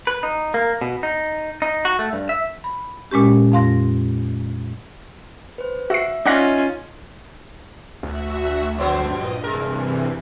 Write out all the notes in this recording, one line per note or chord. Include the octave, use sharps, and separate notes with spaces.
B4
D#4
A#3
B2
D#4
D#4
F#4
A3
G2
E5
B5
A#2 G#3 C#4 G4
F2 F5 C6 A#6
B4 C5
F#4 E5 F5 E6 C7
C#4 D#4 F4 D5 F#5 A#6
D2 F#4 E5
G2 D3 F3 B3 C5
G2 A#2 D#5
C3 E3 G#3 A#4